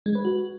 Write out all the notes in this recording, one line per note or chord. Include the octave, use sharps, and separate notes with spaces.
G#3
B4
F#4